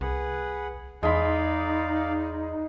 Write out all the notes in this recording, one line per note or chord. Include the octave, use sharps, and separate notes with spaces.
C2 G#4 B4 F#5
E2 G#3 D#4 D5 F5 B5